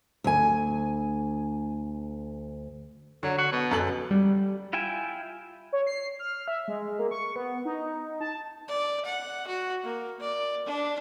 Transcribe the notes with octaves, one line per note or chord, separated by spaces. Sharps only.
D2 G#5
D3 F#3
F#4
B2
F#2 A4 F#7
G3
E4 F4 E5 G5 G#5
C#5
C7
F6
E5
G#3
A#3
C#6
B3
D#4
A5
D5
F#5
F#4
A#3
D5
D4